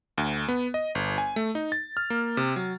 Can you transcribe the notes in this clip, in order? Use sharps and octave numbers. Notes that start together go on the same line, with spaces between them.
D2
B3
D#5
G1
G#5
A3
D#4
A6
F6
A#3
C3
F#3